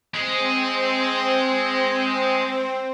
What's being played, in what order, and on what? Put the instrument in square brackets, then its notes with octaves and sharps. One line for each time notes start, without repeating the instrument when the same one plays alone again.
[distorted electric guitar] G#3 G#4 [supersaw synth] C4